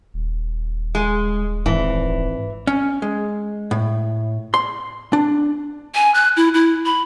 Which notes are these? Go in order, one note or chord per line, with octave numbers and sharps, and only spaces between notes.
D#1
G#3
G#1 E3
C#4
G#3
A2
C6
D4
G#5
F#6
E4
E4
B5